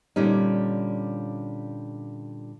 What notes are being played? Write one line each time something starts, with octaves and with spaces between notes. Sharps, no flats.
A#2 D3 G3 C#4 D#4